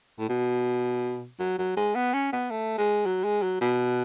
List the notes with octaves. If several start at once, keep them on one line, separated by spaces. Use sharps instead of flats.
A2
B2
F#3
F#3
G#3
B3
C#4
B3
A3
G#3
F#3
G#3
F#3
B2